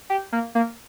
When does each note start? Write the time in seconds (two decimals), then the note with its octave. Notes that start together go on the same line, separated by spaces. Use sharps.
0.10 G4
0.32 A#3
0.55 A#3